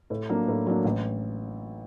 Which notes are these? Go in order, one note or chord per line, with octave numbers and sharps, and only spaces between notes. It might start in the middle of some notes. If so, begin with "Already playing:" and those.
A2
F#3 A#3 D4
A2
F#3 A#3 D4
A1